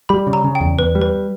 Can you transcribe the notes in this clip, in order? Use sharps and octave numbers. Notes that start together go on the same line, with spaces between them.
G3 B5
C#3
A#5
C#3
G5
E2
E2 B4
G3
B4